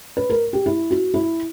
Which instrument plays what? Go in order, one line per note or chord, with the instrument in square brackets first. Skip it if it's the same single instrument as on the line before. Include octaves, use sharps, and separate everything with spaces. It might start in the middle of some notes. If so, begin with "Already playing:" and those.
[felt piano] B4
A#4
G4
E4
F#4
E4